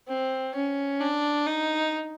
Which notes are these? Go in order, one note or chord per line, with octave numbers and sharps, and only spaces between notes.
C4
C#4
D4
D#4